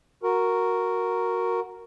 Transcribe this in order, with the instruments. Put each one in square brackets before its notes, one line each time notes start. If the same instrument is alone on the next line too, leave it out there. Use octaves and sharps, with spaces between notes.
[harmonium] F#4 A#4